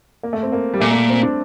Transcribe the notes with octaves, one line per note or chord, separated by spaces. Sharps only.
A#3
A3
C4
A#3
G3
A#2 A3
A3
C4
D4